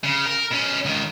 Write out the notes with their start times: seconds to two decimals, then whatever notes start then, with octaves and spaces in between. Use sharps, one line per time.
0.04 C#3
0.26 A#4
0.51 B2 C#4
0.85 C#2 D#3